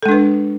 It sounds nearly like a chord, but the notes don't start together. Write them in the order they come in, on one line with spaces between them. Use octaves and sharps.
A4 G#3 D4 B4